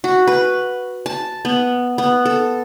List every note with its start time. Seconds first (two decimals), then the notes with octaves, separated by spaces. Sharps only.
0.04 F#4
0.27 B4
1.06 A5
1.45 B3
1.98 B3
2.25 A4